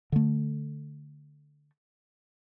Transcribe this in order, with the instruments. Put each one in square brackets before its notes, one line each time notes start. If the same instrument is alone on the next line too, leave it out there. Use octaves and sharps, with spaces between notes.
[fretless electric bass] D3 A3